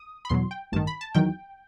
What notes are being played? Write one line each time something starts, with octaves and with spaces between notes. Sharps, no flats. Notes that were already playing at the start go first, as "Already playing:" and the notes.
Already playing: D#6
B5
E2 B2 F#3 C6
G5
A1 G2 D#3 A5
B5
A5
E2 D#3 F#3 G5